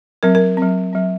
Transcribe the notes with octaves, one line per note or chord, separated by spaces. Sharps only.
F#3 C4 A#4
A#4
F#3 C4
F#3 C4